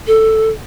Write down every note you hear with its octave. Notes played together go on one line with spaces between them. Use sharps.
A4